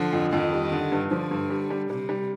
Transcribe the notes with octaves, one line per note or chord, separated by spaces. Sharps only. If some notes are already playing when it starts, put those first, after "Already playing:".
Already playing: D3 F3
F2
F2 D#3
G3
D3
G2
D3 F3
G2
G3
G3
C3 G3
G3